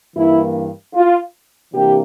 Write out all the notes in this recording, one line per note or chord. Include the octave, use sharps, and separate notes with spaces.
G2 E3 A#3 E4
F4
C3 E3 A#3 D4 G4